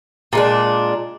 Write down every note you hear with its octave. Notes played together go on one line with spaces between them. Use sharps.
A#2 G#3 D4